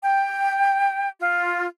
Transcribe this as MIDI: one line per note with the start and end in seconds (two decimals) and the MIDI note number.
0.02 1.09 79
1.20 1.67 65